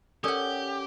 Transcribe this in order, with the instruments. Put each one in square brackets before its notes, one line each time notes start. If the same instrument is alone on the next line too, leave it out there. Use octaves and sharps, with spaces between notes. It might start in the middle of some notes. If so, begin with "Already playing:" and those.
[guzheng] C#4 F#5 [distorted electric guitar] G4 [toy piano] A4 A#4 D5